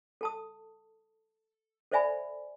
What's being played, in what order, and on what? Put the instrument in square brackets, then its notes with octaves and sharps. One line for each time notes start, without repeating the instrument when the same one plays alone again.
[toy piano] A4 A5 D#6
A4 C5 D5 E5 G#5 B5